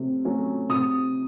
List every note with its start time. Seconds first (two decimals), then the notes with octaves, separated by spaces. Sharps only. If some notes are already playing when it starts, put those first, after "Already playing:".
Already playing: C3 F#3 A3 C#4
0.25 F#3 A3 C#4
0.69 C3 D#6